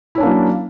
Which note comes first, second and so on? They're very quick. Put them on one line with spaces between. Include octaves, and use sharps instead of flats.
E4 C#4 D4 A#3 F#3